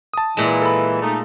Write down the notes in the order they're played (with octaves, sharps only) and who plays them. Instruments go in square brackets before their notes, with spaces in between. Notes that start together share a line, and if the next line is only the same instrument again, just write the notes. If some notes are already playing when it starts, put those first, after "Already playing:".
[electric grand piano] A5 D#6
[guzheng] A#2 G#3 [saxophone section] E3
[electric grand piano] A4 B5
[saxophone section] A3 D#4